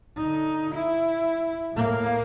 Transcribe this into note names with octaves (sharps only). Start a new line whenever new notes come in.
D3 D#4
E4
A2 A#3